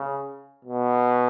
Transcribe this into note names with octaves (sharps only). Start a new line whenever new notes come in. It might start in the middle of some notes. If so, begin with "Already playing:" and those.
Already playing: C#3
B2